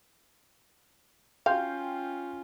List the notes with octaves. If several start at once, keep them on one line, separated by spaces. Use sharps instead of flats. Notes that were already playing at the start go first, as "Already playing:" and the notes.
C#4 F4 F5 G5 C6 G6